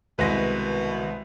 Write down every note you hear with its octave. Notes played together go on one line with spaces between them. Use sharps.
C2 B2 D#3 G#3 B4 A#6